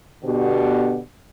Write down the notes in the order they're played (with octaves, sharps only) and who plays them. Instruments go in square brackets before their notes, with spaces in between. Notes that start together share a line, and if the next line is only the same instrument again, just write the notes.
[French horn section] B2 D3 B3 G4